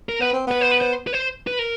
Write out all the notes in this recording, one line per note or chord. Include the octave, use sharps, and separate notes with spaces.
A#4
B3 B4
C4
B3 B4
C5
B4
C5
B4
C5
B4
A#4